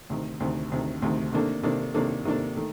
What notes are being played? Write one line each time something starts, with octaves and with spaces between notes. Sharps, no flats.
D2 C3 D#3
D2 C3 D#3
D2 C3 D#3
D2 C3 D#3
C3 D#3 A#3 D4 A4
C3 D#3 A#3 D4 A4
C3 D#3 A#3 D4 A4
C3 D#3 A#3 D4 A4
D#3 A3